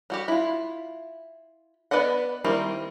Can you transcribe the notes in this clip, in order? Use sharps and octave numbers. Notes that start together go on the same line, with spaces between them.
G3 F#4 G4
E4 F4
B3 B4 D5 D#5 F#5
D#3 G3 A#3 C4 E4